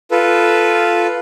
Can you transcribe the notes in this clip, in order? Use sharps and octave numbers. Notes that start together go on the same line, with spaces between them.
F4 A4 B4